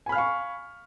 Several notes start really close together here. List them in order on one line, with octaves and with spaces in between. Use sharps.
G#5 B5 F6 F5 C#6